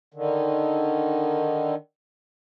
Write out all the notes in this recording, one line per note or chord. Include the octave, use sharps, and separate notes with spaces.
D3 D#3